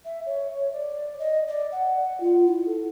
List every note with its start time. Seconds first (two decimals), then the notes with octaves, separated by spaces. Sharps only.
0.05 E5
0.26 C#5
0.72 D5
1.19 D#5
1.48 D5
1.72 F#5
2.20 F4
2.47 E4
2.66 A4